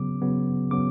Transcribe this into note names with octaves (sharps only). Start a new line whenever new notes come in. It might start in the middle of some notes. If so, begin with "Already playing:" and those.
Already playing: C#3 F#3 B3 D6
C#3 F#3 B3
C#3 F#3 B3 D6